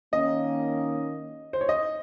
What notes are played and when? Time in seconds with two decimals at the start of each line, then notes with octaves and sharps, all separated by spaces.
0.13 D#3 A#3 C#4 D#5
1.53 C5
1.61 C#5
1.69 D#5